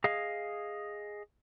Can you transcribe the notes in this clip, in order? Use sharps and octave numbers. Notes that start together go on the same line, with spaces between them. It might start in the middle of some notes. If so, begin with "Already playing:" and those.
G#4 D#5 F5